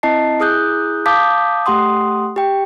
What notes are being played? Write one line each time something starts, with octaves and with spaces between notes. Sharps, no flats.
C4 E4 D#5 A5 C7
E4 G#4 D#6 F#6 G6
F5 A5 D6 D#6 G6 B6
A3 G4 F#5 C6 D#6
G4 G5